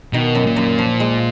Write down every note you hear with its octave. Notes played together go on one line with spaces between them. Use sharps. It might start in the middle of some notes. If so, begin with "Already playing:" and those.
B2 D#3
F#2
A#2
F#2
F3
G#3